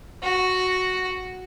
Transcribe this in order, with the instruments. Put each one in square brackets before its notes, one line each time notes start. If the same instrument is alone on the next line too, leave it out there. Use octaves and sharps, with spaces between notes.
[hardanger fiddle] F#4